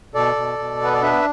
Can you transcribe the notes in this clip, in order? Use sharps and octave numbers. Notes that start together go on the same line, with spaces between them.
B2 A4 D5
B2
B2
B3 B4
D5
D4 B4 E5